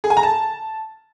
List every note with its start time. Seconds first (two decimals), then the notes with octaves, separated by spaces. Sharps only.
0.04 G#4
0.10 G#5
0.17 A#5
0.23 A5